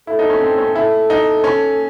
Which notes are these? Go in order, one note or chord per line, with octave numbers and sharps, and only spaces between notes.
E4 A4
D#4
C#4
C4
C#4
E4 A4
D#4
C#4